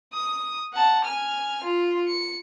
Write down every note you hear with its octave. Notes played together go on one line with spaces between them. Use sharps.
D#6
F#5 A5
G#5 F6
F4
C#7